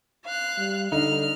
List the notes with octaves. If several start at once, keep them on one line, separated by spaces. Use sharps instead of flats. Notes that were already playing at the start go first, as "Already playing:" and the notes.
F5 F#6
G3
D3 D#4 F6